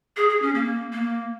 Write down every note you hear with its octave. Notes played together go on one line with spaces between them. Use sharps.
G#4
G#4
C#4
A#3
A#3